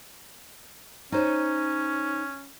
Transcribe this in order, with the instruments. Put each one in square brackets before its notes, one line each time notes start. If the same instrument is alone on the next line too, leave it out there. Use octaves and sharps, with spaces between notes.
[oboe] C#4 [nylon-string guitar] D#4 C5 C#5